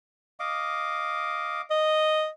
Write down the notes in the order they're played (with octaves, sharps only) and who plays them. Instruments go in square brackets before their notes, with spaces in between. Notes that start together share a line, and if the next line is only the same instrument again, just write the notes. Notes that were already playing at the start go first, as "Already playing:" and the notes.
[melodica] D#5 F5 D6
[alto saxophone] D#5